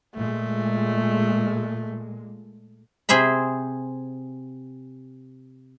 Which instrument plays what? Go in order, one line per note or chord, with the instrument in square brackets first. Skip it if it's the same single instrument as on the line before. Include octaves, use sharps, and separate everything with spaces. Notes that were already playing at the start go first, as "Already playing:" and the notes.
[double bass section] A#2 G#3 [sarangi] A3
[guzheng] C3 G#4 C5 E5 B5